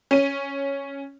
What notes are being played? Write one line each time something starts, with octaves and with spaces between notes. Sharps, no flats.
C#4 D#7